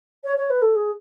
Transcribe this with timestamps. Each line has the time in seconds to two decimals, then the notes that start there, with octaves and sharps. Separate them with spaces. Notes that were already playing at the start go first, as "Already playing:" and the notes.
0.24 C#5
0.37 C#5
0.50 B4
0.61 A4
0.75 G#4